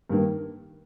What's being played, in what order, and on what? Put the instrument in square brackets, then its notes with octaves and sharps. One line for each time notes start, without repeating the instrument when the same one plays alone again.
[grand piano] G2 D#3 A#3